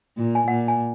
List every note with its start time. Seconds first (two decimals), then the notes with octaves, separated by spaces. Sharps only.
0.17 A#2
0.35 G#5
0.47 A#2 F#5
0.68 G#5